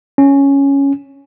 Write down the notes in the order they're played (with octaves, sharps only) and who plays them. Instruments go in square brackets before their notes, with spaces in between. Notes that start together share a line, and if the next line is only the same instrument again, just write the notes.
[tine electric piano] C#4